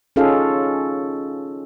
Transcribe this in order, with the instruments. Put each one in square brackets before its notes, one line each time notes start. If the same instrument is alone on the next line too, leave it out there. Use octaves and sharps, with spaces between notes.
[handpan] C#4 D#4 F4 G#4 A4 F5